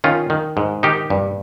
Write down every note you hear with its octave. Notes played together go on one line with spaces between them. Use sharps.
D#3 C#4 F4
D#3
G#2
D#3 D#4 G4
G2